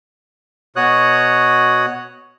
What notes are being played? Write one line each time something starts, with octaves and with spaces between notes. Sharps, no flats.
B2 F#4 C#5 D#6 F#6